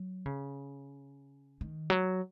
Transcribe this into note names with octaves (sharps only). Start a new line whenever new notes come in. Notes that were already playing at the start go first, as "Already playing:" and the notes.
Already playing: F#3
C#3
D#3
F#3